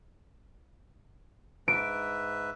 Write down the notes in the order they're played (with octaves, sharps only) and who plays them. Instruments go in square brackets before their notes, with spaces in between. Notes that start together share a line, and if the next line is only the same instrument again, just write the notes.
[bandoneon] G#2 B4 E5 [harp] D7